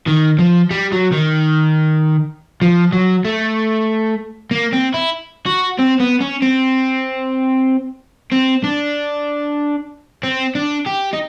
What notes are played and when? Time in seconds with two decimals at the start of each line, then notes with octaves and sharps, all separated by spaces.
0.07 D#3
0.39 F3
0.71 G3
0.92 F#3
1.13 D#3
2.62 F3
2.93 F#3
3.25 A3
4.51 A#3
4.73 C4
4.94 E4
5.46 F#4
5.79 C4
6.00 B3
6.21 C#4
6.42 C4
8.32 C4
8.64 D4
10.23 C4
10.55 D4
10.86 G4
11.13 D#4